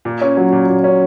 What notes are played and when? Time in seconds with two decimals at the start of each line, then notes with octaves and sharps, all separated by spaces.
0.05 A#2
0.21 C#4
0.37 F#3
0.52 A#2
0.69 A#2
0.84 C#4